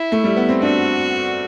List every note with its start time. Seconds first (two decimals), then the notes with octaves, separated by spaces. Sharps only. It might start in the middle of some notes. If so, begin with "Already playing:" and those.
Already playing: E4
0.12 A3
0.24 G3
0.37 B3
0.49 C4
0.62 D4 F#4